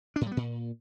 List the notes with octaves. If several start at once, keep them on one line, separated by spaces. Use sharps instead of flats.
D4
A2
G3
B3
A#2